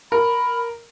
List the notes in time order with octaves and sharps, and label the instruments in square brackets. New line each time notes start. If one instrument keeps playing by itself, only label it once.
[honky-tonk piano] A#4 [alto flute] B5